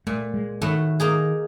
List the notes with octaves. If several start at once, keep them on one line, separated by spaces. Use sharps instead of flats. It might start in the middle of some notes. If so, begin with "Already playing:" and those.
A#2 A3
G#3
A2 D#3 A3 F#4
A#3 D#4 G#4